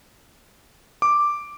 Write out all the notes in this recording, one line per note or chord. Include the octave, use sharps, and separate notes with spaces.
D6